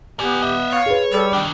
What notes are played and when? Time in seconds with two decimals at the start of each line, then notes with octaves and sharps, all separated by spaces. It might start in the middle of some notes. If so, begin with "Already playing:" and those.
0.20 B3 G4 D5 G#5
0.42 D#5 E5
0.72 C#5 F5
0.86 G#4 B4
1.12 G3 A4
1.33 D#3 D4 G5